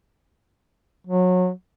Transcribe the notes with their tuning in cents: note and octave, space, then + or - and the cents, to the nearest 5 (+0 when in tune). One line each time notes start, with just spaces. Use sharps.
F#3 -25